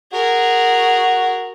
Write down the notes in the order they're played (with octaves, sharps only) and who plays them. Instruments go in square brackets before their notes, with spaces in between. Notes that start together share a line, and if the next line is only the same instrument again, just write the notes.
[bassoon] F#4 [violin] G#4 A#4